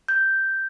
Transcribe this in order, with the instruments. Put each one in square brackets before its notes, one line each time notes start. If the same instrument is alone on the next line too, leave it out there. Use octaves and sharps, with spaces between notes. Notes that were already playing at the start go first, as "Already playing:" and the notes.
[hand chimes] G6